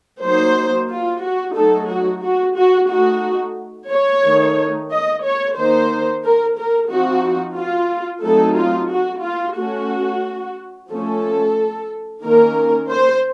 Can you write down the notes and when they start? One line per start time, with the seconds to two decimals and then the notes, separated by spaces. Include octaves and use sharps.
0.24 F#3 A#3 D#4 C5
0.90 F4
1.23 F#4
1.57 F#3 A3 D#4 A4
1.90 F#4
2.24 F#4
2.57 F#4
2.90 A3 D#4 F#4
3.91 C#5
4.24 D#3 A3 D#4
4.90 D#5
5.24 C#5
5.57 D#3 A#3 D#4 C5
6.24 A#4
6.57 A#4
6.91 F3 C4 D#4 F#4
7.57 F4
8.24 F#3 A3 C4 D#4 A4
8.57 F4
8.91 F#4
9.24 F4
9.57 A3 C#4 F#4
10.91 F3 A3 C#4 A4
12.24 D#3 A#3 C#4 A#4
12.91 C5